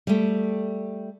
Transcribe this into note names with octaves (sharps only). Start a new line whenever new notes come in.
G3 A3